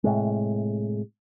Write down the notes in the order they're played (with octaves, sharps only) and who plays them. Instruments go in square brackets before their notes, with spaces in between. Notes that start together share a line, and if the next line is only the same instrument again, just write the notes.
[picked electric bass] A2 C3 G#3